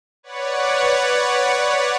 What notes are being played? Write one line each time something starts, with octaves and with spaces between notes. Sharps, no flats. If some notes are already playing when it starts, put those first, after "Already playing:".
B4 C#5 D5 F#5